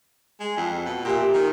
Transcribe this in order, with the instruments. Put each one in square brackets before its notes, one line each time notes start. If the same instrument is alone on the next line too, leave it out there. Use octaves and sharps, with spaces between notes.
[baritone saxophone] G#3
F2
B2
[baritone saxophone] A#2 [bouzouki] G4 E5
[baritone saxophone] D#3